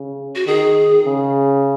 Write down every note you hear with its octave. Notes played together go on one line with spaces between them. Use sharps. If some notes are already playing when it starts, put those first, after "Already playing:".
Already playing: C#3
F#4
D#3 G#4
C#3